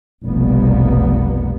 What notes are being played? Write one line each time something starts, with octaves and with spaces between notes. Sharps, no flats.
F1 B1 G3 A#3 B3